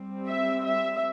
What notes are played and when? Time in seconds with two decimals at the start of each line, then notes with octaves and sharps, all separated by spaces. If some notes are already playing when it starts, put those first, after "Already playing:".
Already playing: G3 C4
0.28 E5
0.66 E5